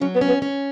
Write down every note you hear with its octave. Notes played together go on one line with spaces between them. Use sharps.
F#3 C#4
B3
C#4
B3
C#4